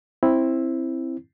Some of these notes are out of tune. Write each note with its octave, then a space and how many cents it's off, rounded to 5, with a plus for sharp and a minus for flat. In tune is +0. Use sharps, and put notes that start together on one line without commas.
C4 +10 E4 +0